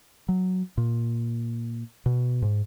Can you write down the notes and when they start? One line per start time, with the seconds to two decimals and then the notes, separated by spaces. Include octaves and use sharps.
0.29 F#3
0.77 A#2
2.06 B2
2.42 G#2